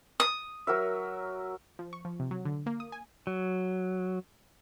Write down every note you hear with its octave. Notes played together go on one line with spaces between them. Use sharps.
D#6
F#3 A#4 E5
F3
C#6
F3
C3
F#3
D3
A#3
D#6
G#5
F#3